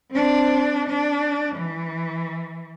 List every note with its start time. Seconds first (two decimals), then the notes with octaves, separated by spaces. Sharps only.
0.11 C4 D4
0.89 D4
1.55 E3